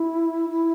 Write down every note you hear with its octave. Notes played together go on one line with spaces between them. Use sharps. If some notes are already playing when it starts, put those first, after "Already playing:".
Already playing: E4
E4